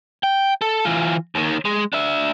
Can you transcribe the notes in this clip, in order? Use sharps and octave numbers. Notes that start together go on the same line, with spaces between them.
G5
A4
E3 F4
D#2 D#3
G#3
D4 E5